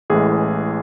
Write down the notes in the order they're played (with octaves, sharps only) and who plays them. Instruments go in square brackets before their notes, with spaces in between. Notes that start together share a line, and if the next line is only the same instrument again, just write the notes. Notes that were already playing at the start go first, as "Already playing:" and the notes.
[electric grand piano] A1 A2 E3 G#3 G#4